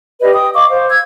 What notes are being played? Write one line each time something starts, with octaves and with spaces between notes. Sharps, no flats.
G4 B4 D5 D#5
G5 D#6
D#5 F5 C#6 D6
C5 F5
E6 G#6